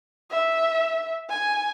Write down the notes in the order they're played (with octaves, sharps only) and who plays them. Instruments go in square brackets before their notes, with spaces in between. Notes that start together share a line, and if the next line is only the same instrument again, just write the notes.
[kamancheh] E5
G#5